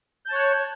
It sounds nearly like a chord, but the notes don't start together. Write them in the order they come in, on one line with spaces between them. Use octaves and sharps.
G6 A5 C#5 F#6 C#6